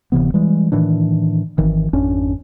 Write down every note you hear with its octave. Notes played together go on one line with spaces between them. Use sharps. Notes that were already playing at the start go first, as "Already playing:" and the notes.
D1 C3 E3 B3
E3 G3 G#3
A2 D#3 E3 D4
G#1 D#3 E3
G#1 F2 C#4 D4